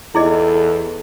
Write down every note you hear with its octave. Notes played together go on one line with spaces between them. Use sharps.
E2 E4 G#4 A4 D#5